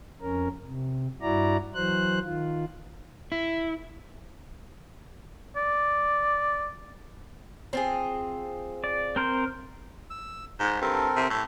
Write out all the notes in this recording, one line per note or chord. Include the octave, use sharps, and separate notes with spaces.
F2 C#4 A#4
C3
G2 E4 F#4 D5 A#5
E3 F#3 C5 F#6
D#3 F4
E4
D5
C4 F4 G#4
D5
C4 A#4 C5
E6
G#2 A#5
G2 C4 A4 A#4
C3
A2